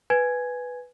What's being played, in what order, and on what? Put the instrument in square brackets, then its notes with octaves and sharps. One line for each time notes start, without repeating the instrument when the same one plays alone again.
[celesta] B4 G#5 G#6